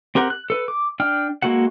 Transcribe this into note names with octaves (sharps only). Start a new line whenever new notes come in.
C4 G4 A#4 F#5
F#6
A4 B4
D6
D4 G5 F6
G#3 A#3 F#4 A4 F#5